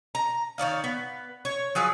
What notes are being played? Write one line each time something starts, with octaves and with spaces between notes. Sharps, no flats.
A#5
D#3 C#5 D5 F5
B3
C#5
F3 F#3 G#4 B4